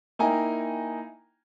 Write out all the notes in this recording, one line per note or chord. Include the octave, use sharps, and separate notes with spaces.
A#3 D#4 E4 G5 G#5 A#5